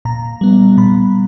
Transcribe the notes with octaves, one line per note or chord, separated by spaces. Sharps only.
A#2 A#5
G3 B3
A#2 B5